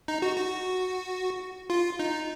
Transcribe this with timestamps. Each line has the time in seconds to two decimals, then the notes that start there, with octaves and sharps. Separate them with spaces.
0.08 D#4
0.22 F#4
0.37 F#4
1.70 F4
1.99 D#4